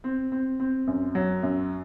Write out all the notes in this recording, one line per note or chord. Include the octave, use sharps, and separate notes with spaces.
C4
C4
C4
F#2
F#3
F#2